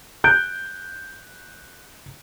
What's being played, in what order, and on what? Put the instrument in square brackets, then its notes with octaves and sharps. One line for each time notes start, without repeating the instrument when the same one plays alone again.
[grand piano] F#6 G6 D7